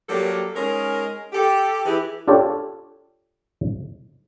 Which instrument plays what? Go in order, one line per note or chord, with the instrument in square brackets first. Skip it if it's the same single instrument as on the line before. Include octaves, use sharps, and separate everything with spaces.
[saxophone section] F#3 G3 A#3 G4 A4
G#3 C#4 D#4 A#4
G4 A4
E3 E4 G4 G#4 B4
[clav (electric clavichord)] D4 F4 G4 A4 C#5